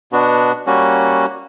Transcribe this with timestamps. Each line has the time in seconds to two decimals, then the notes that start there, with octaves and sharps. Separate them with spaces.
0.13 B2 B3 D4 F#4
0.67 G3 A#3 C#4 F#4